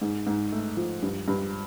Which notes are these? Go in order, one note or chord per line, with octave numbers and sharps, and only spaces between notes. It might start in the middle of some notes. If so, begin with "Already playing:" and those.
G#2
G#2
A3
F3
G2
G2